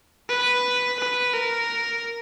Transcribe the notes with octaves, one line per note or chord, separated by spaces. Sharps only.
B4
B4
A#4